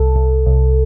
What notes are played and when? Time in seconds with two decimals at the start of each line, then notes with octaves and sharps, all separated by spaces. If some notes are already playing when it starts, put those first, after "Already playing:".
Already playing: C2 A4
0.16 C2
0.46 C2